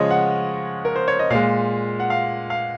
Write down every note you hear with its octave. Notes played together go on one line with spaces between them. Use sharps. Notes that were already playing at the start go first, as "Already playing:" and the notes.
Already playing: C#3 F3 G#3 C#5 D#5
F#5
A#4
C5
C#5
D#5
A#2 G#3 F5
F#5
F5
F5